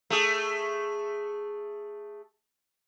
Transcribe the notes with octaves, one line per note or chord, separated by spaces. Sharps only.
A3 G#4